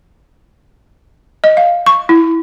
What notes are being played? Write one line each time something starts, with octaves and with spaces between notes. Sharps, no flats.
D#5
F5
C#6
E4